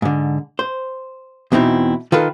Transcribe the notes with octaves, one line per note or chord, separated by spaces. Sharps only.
G#2 D3
C5
E2 B2 C4 D#4 E4
D#3 F4 A4 B4